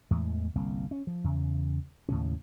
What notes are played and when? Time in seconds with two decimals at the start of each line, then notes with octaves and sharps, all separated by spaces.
0.11 E2 A2 E3 G#3
0.55 G1 C2 A#3 C4
0.91 C#4
1.07 F3
1.24 E2 C#3
2.09 D#2 A2 C#3 C#4